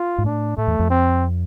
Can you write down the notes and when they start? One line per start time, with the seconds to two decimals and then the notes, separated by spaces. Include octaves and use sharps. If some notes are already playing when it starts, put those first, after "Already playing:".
Already playing: F4
0.18 G#2
0.24 A2 D4
0.57 A2 A3
0.67 E2
0.79 F2
0.90 C4